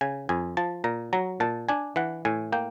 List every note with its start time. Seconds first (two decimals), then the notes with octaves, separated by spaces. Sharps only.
0.01 C#3 G#5
0.29 F2 G#5
0.57 F3 A5
0.84 A#2 A#5
1.13 F#3 A#5
1.40 A#2 A5
1.69 D4 G#5
1.96 E3 F#5
2.25 A2 G#5
2.52 A#3 G5